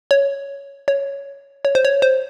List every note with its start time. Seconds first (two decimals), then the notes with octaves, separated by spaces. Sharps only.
0.11 C#5
0.88 C#5
1.65 C#5
1.75 C5
1.85 C#5
2.02 C5